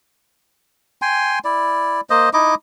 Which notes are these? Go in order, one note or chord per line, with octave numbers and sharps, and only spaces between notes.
G5 G#5 C6
E4 D5
A#3 C5 D#5
D#4 E4 D#5 D6